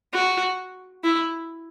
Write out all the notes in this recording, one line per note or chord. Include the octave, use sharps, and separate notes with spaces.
F#4
E4